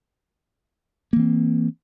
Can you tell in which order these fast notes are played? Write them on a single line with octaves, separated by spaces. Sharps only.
A#3 E3 C4